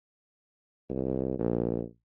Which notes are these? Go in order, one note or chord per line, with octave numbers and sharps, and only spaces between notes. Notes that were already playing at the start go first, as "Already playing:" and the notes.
C2
A#1